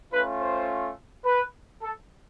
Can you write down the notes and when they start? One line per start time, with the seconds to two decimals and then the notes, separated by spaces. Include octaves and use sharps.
0.12 A3 C#4 F4 B4
0.40 C5
1.25 B4
1.82 A4